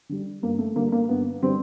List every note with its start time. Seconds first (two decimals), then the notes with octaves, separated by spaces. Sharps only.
0.09 D3 G3
0.43 G2 A#3
0.58 A3
0.76 D3 G3 A#3
0.92 A#3
1.09 G2 B3
1.42 D3 G3 C4